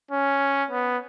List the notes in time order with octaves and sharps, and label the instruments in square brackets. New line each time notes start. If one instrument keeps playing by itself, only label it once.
[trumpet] C#4
B3